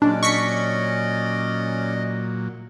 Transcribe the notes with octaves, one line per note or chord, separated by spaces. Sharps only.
A#2 F#3 G#3 C#4 D4 D5
D#5 C#6 B6 C#7